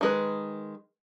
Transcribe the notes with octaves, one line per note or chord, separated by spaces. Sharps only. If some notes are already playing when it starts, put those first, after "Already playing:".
D#3 G#3 B4